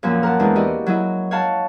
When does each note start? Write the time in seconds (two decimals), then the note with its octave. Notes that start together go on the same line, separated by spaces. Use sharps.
0.03 F#2 A#2 F3
0.23 A#4 F#5 A5
0.39 E2 E3 G#3 D4
0.56 E4 F#4 G4 D5 D#5
0.86 F#3 E4 D#5
1.31 C#5 F5 F#5 A5